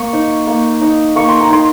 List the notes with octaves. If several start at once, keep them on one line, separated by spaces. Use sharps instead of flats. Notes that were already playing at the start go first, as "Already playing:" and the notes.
Already playing: A#3 C#6
D#4
A#3
D#4
A#3 C#6
C6
A#5
D#4 C6